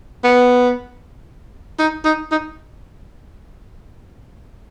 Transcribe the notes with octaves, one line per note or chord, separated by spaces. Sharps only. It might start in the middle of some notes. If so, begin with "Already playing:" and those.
B3
D#4
D#4
D#4